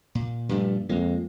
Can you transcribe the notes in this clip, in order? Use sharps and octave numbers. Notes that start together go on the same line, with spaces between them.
A#2
G2 A#2 F3 A3
F2 G#3 A#3